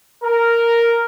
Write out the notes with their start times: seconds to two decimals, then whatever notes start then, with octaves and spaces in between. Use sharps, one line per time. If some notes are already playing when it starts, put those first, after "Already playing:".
0.23 A#4